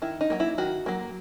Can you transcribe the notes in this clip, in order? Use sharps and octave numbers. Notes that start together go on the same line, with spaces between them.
D#3 E4
D#4
F#3 A#3
E4
D#3 F#4
F#3 A#3